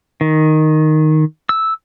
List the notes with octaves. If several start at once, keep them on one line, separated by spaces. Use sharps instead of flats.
D#3
E6